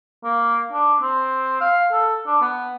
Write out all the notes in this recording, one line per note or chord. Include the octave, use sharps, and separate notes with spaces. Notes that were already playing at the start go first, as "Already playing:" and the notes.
A#3
D4
C4
F5
A4
D4
B3